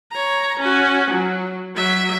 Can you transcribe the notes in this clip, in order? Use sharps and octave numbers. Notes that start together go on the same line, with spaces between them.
C#5 A#5
C#4 F#4
F#3
F#3 E5